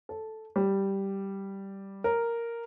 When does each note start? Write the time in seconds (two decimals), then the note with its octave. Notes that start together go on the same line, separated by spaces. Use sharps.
0.09 A4
0.56 G3
2.04 A#4